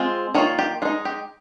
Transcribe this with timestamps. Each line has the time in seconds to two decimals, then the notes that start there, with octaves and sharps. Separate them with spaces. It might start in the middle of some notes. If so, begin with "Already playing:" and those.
Already playing: G#3 C4 F4
0.34 D#3 A#3 F4 C#5
0.59 G4
0.82 G#3 F4
0.85 D#4
1.05 G4